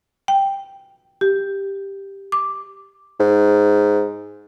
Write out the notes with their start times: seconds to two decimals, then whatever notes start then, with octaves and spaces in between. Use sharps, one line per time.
0.28 G5
1.21 G4
2.32 D6
3.20 G#2